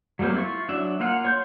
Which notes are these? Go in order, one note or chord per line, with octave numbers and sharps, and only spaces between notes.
F#3 G3 A3 A#3 C4
E4 F4 C#6
F#3 D4 E5
A#3 F4 F5 F#5
C#5 C6 G6